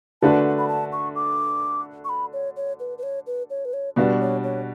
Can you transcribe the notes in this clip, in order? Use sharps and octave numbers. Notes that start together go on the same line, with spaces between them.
D3 A3 D4 F#4 B4 A5
B5
A5
C#6
D6
C#6
B5
C#5
C#5
B4
B4
C#5
B4
C#5
B4
C#5
B2 G3 D4 F#4 B4
C#5
C#5